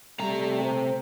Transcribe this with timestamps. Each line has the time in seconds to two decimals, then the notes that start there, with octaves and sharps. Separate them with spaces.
0.20 C3 G3 A3 A#5
0.63 C5